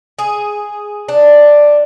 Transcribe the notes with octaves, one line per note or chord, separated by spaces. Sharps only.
G#4
D4